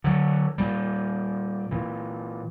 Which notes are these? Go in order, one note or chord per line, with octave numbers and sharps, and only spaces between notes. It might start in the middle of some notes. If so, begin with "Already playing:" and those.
D3 F#3
A#2 G3
A#2 E3